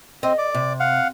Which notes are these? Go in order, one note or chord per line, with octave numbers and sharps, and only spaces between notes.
C4 D#5
D5
C3
F5 F#5